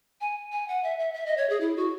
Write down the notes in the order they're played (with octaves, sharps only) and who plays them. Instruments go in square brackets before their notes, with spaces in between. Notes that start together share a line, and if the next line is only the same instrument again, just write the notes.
[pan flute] G#5
G#5
F#5
E5
E5
E5
D#5
C#5
G#4
E4
F#4